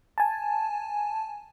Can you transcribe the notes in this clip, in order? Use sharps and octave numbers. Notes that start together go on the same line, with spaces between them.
G#5 A5